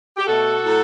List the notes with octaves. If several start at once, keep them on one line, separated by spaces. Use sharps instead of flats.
G4
B2 A3 F#4 A4
A2 F#3 A3